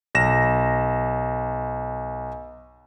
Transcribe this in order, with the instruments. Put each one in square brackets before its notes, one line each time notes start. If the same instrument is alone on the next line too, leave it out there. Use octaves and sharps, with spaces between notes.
[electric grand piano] B1 A#6 E7